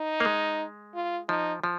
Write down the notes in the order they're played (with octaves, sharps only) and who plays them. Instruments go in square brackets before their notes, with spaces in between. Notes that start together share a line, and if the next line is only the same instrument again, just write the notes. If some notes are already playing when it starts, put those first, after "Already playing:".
Already playing: [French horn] D#4
[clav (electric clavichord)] A#3
G#3
[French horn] F4
[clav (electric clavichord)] F3 [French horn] D#4
[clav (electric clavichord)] F3